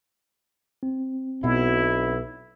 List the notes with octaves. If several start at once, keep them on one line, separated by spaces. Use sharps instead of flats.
C4
B1 B2 E4